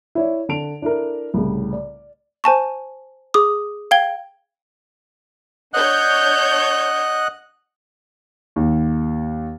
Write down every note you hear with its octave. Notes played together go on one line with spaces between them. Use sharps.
E4 C#5 D5
D3 A5 D7 F7
D4 E4 A4 A#4
C2 A2 C#3
D5
C5 G#5 A5 C#6
G#4 D6 D#6
F5 G5 G#6 G7
D4 C#5 D#5 F#5 F#6 G6
D#2